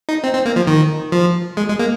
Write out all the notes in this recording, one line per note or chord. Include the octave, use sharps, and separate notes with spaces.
D#4
C4
C4
A#3
F3
D#3
F3
G#3
G#3
A#3